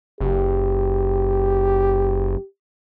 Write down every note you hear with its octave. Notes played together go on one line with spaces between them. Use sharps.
F#1 G4